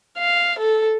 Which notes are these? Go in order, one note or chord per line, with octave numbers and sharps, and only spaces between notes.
F5
A4